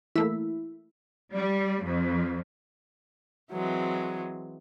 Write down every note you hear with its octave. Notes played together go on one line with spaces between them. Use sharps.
E3 A3 A#3 E4
G3
F2
E3 F#3 G#3 C4